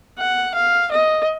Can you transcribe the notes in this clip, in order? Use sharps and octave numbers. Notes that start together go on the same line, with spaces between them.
F#5
F5
D#5